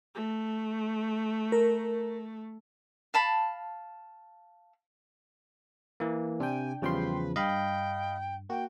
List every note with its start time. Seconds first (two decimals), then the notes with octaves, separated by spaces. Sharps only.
0.15 A3
1.52 A#4
3.14 F5 A5 B5
6.00 E3 A#3
6.40 C3 D4 G5 G#5
6.82 E2 C#3 F3 G3 B4 G5 C6
7.36 G2 D#5 F5 G5 B5
8.49 A#3 F#4 G5